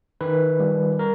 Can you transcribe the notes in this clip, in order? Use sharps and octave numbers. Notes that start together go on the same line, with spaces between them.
D#3 B4
G3
A#4